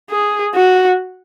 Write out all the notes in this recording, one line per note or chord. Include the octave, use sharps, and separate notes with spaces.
G#4
F#4